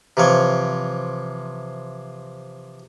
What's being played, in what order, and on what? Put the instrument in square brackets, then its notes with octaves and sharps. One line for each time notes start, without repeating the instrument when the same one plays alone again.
[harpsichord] C3 E3 F3 C#5